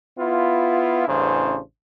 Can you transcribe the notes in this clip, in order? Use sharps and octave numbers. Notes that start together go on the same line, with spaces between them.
B3 E4 F4
A1 E2 C#3 D4 C5